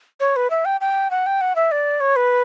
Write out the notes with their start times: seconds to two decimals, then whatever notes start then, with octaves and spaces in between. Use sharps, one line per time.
0.20 C#5
0.36 B4
0.50 E5
0.65 G5
0.81 G5
1.11 F#5
1.26 G5
1.41 F#5
1.56 E5
1.72 D5
2.00 C#5
2.16 B4